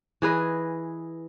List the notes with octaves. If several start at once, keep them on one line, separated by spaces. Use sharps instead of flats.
E3 G#4 B4 D#5